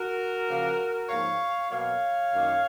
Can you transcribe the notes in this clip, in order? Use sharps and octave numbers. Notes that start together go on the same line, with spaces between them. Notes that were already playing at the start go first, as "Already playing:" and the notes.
Already playing: F#4 A#4
C#3 F3 A#3
G#2 F3 A#3 C#5 F5
B2 F#3 A#3 C#5 F5
F#2 D#3 A#3